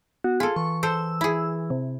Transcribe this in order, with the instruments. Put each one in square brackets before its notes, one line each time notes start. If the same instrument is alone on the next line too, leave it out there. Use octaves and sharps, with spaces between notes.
[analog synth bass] B3 [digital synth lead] F#4
[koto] F4 A4 [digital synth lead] G#4
[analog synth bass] E3 [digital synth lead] C#6
[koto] A4 C5 [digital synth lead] E6
[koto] E4 G#4
[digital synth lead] C3